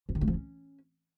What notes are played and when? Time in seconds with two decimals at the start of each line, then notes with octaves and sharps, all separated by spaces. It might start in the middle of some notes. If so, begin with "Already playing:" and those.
0.09 F3
0.15 D#3
0.21 A3
0.28 F3
0.34 C#4